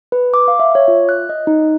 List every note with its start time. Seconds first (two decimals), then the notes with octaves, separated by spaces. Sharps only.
0.12 B4
0.34 D6
0.48 F5
0.60 E5
0.75 C#5
0.88 F4
1.09 F#6
1.29 D#5
1.47 D#4